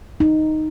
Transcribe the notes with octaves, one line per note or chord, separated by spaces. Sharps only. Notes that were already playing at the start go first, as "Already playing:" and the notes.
D#4